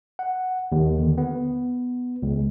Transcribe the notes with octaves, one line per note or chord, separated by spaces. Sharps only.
F#5
D#2
D3
B3
C#2